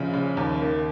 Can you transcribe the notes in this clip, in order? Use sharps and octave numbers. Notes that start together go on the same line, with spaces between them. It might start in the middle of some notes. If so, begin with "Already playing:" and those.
Already playing: A#1 C#3
C#3
D#2
D#3